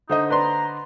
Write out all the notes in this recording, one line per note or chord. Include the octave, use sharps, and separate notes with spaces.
D3 D#4 C5 D#5
B4 D5 A#5 C6